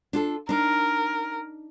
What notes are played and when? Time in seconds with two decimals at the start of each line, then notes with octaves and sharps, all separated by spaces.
0.13 D4 F4 A4
0.49 D4 D#4 A#4